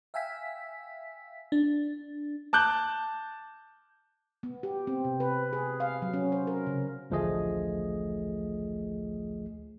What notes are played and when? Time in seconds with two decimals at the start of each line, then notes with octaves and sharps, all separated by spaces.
0.14 E5 F5 G5 G#5 E6 B6
1.52 D4
2.53 A5 D6 F#6 G6
4.43 B3
4.63 G4
4.87 C4
5.05 C3
5.20 B4
5.53 G#4
5.80 F5
6.02 F#3
6.14 C#4
6.32 C5
6.47 A#4
6.67 C#3
7.10 A1 D2 F3 A3 G#4 D#5